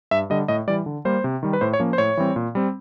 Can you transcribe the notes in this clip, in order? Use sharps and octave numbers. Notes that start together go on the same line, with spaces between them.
G2 E5
D3 G3 D#5
A2 D#5
E3 G3 D5
D3
G3 A#3 C5
C3
D#3 G3
B4
A2 C5
C#5
F3 A#3 C#4
C5
A2 C#5
E3 G3 C4
A#2
G3 C4